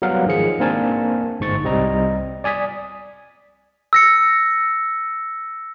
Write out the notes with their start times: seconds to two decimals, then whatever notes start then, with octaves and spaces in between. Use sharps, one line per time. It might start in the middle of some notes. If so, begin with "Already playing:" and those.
0.02 F#3 G3 B3 A#4 F5 F#5
0.26 G#2 D#3 F3 G#4 C#7
0.60 A#3 C4 D4 A#4 G#5 A5
1.40 G1 G#2 C#6 A6
1.64 C2 G3 C4 D#5 A#5
2.44 D5 G#5 D#6 B6
3.93 E6 A#6 C#7